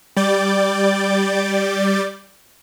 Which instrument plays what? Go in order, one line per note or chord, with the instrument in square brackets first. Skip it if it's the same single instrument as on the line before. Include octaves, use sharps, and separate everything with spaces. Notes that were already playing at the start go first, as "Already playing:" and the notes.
[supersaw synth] G3 D5 D6 G6 A6